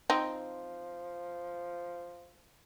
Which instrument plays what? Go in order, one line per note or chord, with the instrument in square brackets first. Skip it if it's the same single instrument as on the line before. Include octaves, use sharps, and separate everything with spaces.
[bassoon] F3 [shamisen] C4 D#4